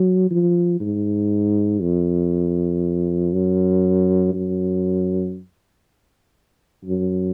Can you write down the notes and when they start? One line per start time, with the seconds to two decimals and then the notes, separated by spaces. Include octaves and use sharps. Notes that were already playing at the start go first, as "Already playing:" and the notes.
Already playing: F#3
0.31 F3
0.80 G#2
1.81 F2
3.33 F#2
4.33 F#2
6.85 F#2